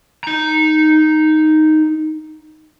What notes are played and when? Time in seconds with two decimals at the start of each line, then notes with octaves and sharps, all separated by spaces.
0.24 D#4 A#5